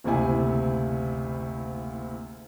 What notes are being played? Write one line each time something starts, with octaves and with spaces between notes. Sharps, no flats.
F#1 D2 C3 E4 G#5